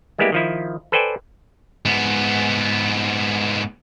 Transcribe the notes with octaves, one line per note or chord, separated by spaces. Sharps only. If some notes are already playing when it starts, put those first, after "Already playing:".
G3 G#3 A#3 B3 E4 G4
D#3 F3 E4
A4 B4 C5 D5 G5 G#5
G#2 B3